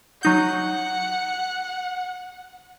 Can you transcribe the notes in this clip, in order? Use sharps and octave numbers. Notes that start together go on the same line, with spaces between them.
F#3 D#4 F#5 G6